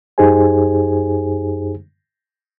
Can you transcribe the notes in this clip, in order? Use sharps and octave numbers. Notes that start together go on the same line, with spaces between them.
F#2 D#4 G4 G#4 C5 G#5